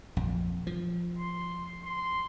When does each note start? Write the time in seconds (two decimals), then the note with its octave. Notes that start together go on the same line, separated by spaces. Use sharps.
0.17 A#1 F2
0.67 F3
1.19 C6
1.83 C6